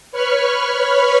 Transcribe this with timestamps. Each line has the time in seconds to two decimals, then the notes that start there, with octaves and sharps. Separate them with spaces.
0.12 B4 C#5 B5 C#6 F6